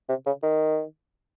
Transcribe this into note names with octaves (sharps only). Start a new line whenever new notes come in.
C3
C#3
D#3